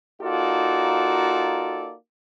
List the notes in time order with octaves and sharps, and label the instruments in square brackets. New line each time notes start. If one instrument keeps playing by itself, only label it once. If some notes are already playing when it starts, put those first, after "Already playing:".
[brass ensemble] A#3 D#4 F4 F#4 A4 D5